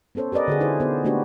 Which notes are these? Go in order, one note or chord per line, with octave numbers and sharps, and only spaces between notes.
B3 C#4 A4 C5 C#5
G4 A#4 B4 D5 D#5
D3 F#4 G#4
D#4 E4 G#4 A4 C5
B3 C5
A3 A#3 D4 F#4 G4 B4